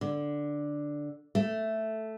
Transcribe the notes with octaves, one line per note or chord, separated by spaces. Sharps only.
D3
A3